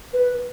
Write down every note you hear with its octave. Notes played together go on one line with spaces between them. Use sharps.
B4